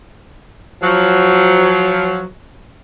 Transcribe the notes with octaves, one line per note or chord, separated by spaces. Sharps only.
F3 F#3